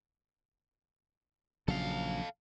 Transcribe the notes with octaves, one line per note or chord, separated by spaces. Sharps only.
A#1 C#3 F#3 A4 F5